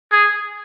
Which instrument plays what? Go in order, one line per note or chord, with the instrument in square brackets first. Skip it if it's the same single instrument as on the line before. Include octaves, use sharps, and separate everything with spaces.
[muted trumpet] G#4